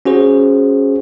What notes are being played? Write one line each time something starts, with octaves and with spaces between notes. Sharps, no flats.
C#4 F#4 G#4 C5